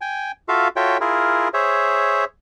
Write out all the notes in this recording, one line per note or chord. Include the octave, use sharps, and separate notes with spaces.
G5 G#5
F4 F#4 A4 E5 F5
F4 F#4 A4 C#5 E5 G5
E4 F4 G#4 A#4
G#4 C5 C#5 E5